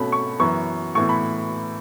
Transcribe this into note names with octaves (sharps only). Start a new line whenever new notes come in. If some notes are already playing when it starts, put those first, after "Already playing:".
Already playing: B2 A3 C#4 B5
C#6
F#2 E3 B3 C#6
A2 E3 B3 C#6
B5